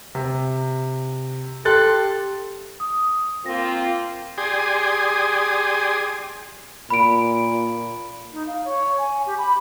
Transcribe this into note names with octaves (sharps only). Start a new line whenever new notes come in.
C3
G4 A4 C6 F#6 A6
D#6
A#3 C4 F4 A#6
G4 G#4 D5 G#5 C6 D#6
A#2 B5 D7
D#4
F5
C#5
G#5
G4
B5